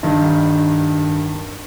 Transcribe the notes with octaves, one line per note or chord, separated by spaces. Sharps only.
G2 D#3